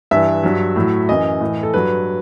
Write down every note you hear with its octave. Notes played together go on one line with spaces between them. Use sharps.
G2 E3 E5
G2 F#3
A2 F#3
F#2 E3 D#5
A2 E3
A4
G2 F#3 B4